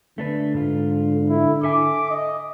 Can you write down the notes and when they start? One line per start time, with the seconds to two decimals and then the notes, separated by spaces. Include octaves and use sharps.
0.18 D3 A3 D4 B4
0.54 G#2 F4
1.29 E4
1.63 A4 E5 G#5 D6
2.11 D#5